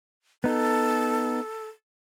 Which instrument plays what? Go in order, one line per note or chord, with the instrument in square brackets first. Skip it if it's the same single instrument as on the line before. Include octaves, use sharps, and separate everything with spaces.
[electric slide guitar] B3 D#4 [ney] A4